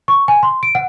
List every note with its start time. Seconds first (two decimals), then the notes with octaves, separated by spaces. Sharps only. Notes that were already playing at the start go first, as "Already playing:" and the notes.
0.08 C#6
0.28 G#5
0.43 C6
0.63 D7
0.75 F#5